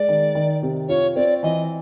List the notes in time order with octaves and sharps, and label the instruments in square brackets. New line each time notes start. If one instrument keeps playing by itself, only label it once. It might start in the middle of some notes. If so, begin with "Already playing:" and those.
Already playing: [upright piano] G#3 [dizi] D5
[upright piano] D#3
D#3
C3
[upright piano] F4 [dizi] C#5
[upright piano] C4 [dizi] D5
[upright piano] E3 [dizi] D#5